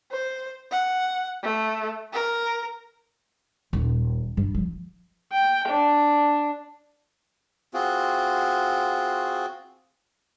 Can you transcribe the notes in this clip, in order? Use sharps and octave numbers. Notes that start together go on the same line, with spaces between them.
C5
F#5
A3
A#4
D#1
G2
F3
G5
D4
C4 F4 F#4 G#4